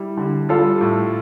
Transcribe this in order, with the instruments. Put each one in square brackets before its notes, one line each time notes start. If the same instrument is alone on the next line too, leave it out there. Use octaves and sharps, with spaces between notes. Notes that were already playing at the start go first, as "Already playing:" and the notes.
Already playing: [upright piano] G3 [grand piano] E4
[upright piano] D3
[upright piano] G3 [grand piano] F4 A4
[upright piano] A2